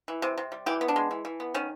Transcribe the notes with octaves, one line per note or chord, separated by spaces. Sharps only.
E3
C3
C3
G3
E3 G4
B3
D4
G#3
E3
E3
B3
D#3 C#4